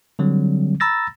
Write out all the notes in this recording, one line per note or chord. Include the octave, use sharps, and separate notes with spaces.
D3 F#3 G3 C4
A#5 B5 E6 A6 A#6